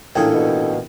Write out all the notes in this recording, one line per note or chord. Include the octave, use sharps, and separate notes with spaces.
A1 A#2 D4 E4 G#4 A4 G5
B2